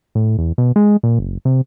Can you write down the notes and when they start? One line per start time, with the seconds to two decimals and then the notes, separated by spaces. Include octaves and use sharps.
0.15 A2
0.38 E2
0.58 B2
0.76 G#3
1.03 A#2
1.19 F#1
1.45 C3